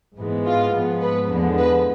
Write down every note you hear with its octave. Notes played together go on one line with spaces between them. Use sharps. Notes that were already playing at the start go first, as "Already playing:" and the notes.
G#2 E3 G#3 B3
F4
G#2 F3 G#3 B3
B4
E2 D3 F3 G#3 B3
B4